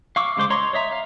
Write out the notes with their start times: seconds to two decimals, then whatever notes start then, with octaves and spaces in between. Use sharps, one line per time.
0.16 F5 C#6 D6 E6
0.37 C#3 G#3 C5 D6
0.50 C#5 D#5 A#5 C6
0.73 C#5 D#5 E5 A#5
0.91 F5 A#5